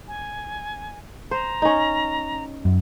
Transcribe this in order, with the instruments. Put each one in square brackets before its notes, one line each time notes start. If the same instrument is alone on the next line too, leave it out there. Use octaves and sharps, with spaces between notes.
[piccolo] G#5
[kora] C5 [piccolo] A#5
[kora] C#4 D#4
[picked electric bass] F#2